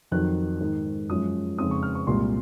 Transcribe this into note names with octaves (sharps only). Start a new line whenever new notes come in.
F2 D#3 F#3 F#6
G#2 D#3 G#3
F#2 F3 G#3 C#4 D#6
F2 C#3 G#3 C4 D#4 D#6
C#6
F6
C#6
C2 A#2 G#3 C6